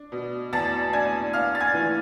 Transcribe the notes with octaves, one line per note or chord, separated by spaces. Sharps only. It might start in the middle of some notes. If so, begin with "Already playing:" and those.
Already playing: D4
B2
E2 A5 A6
D4 G#5 G#6
D4 F5 F6
A6
G#5 G#6
E3